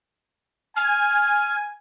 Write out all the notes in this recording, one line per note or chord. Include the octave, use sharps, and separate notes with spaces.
G#5 F6